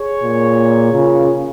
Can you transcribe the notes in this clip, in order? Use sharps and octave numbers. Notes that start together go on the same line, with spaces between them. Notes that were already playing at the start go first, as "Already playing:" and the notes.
Already playing: G#4 C#5
A#2
C#3 F4 A#4